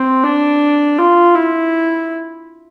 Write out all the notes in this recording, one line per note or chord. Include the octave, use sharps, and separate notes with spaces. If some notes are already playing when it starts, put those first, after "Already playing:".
Already playing: C4
D4
F4
E4